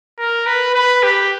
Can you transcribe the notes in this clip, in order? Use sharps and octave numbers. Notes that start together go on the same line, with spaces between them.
A#4
B4
B4
G4